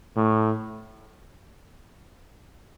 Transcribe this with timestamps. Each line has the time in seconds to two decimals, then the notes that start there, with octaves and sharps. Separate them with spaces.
0.16 A2